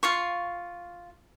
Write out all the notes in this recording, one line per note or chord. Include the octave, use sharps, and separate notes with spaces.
F4 F5 C#6